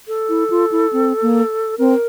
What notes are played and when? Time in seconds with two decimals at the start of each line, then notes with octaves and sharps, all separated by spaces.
0.08 A4
0.29 E4
0.50 F4
0.72 E4
0.93 C4
1.22 A#3
1.78 C4 A#4